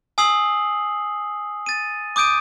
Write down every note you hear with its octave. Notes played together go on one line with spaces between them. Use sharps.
G#5 D#6 E6 C7 F#7
A6 D#7
D6 D#6 G6 D7 D#7